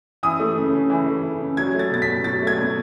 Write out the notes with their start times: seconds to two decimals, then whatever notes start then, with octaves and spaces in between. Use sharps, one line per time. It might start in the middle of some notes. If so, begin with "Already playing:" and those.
0.23 E3 D#6
0.40 A3
0.57 C#3
0.74 C#3
0.90 E3
1.07 A3
1.23 C#3
1.41 C#3
1.57 F#3 G#6
1.75 A3 A6
1.92 B2 A6
2.02 B6
2.08 B2
2.24 F#3 A6
2.42 A3 G#6
2.58 B2